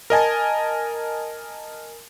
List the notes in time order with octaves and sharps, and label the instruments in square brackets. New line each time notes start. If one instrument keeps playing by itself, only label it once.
[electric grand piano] A#4 D#5 G#5 A5